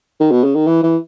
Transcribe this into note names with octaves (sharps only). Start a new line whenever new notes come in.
D#3
B2
C#3
D#3
E3
E3